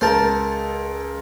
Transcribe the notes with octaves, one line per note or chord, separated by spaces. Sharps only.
C#2 A#4 C5 A5